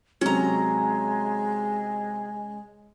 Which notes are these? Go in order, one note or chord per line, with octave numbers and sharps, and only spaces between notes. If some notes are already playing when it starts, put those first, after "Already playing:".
C3 F#3 G#3 C#4 A#5